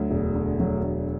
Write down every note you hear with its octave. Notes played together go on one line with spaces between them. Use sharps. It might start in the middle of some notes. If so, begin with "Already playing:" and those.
Already playing: D2 F#3
E1
D3
F#3
D2